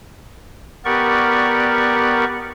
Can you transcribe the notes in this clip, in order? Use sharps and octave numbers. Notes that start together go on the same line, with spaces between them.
B3 G4 A#4 D5 C#6